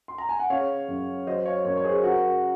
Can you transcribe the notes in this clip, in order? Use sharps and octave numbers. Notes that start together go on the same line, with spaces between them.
C6
A#5
G#5
F#5
C#3 C#5 F5
F#2
F#3 C5 D#5
C#5 F5
F#2 A#4 C#5
C#5
G#4 C5
C#3 F#4 A#4